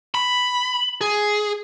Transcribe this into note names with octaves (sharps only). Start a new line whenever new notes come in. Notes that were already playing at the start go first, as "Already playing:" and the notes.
B5
G#4